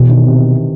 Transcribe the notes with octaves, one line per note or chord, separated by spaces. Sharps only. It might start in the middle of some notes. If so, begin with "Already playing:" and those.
Already playing: B2 E3
D#3
C3